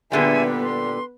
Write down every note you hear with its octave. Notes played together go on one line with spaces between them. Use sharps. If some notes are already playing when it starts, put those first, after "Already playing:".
A#2 D3 G3 B3 G#4 B4 E5 G#5
C6